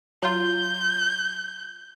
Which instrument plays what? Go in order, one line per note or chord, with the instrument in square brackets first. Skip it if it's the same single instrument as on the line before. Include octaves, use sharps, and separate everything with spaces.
[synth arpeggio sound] F#3 F4 [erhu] G6